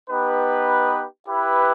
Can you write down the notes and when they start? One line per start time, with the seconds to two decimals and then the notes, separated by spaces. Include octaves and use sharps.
0.10 B3 D#4 G4 B4
1.28 E4 G4 B4